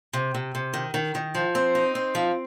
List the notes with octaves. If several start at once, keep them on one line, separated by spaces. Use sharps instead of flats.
C3
C3
C3
D#3
D#3
D#3
F3
C4
D#4
C4
F3